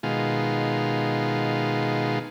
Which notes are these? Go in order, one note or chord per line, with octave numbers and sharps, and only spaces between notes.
B2 D#3 G#3 F4